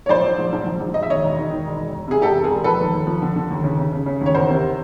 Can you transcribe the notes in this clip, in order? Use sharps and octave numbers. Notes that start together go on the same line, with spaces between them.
C#5
A#1 C5 D5
F3
A#1
A#1
A#1
A#1
E1 D#5
E5
D#2 C#5 D#5
E1
D#3
D#3
E1
E1
E1
C3 G#4
E1 G4 A4
E1
G#4 A#4
E1
F3 A4 B4
D#2
D#2
F3
D3
D3
D#2
C#3
C#3
C#3
C#3
D#2 C#5
E2 A#4 C5
C3